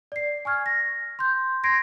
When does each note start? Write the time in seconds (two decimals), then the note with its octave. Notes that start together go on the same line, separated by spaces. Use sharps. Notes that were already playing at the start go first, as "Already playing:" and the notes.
0.12 D5 C7
0.45 G#5 C#6 F6 G#6
0.66 A#6
1.19 C6 G6
1.63 C6 G#6 A#6 C7 D7